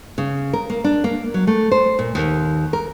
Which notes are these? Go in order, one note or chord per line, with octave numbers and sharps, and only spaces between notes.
C#3
A#4
A#3
D4
A#3
F#3
A3
C5
A#2
D#2
A#4